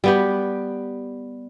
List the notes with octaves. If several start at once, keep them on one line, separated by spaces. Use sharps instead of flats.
G3 B3 G4